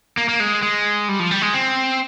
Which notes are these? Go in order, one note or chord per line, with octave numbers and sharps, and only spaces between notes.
A#3
A#3
G#3
G#3
G3
F3
G3
G#3
C4